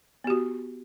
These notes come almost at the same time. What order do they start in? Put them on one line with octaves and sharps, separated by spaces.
B3 G4 F#4